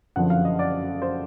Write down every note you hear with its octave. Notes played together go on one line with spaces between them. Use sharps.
F#1 F2 D3 F3 F#5
F5
D#5
D5
C5